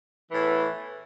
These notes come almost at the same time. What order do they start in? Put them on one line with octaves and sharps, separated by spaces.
E3 A2 E2